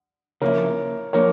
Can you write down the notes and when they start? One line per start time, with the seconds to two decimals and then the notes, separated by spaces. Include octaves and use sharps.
0.41 C#3 F3 A#3 E4 A#4 C#5
1.13 F3 A#3 A#4 C#5